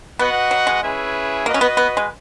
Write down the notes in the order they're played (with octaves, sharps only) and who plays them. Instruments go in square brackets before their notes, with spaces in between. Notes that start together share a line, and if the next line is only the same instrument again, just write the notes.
[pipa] B3 [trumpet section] F#4 B4 D#5 F#5
[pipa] F#3
G#3
[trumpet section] C#4 E4 G#4 B4 E5
[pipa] A#3 [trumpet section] F#4 B4 D#5
[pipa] C#4
B3
B3
G#3